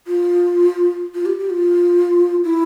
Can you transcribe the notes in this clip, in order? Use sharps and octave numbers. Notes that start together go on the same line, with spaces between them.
F4
F4
G4
G4
F4
E4